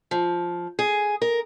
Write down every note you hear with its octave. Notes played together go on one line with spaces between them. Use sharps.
F3
G#4
A#4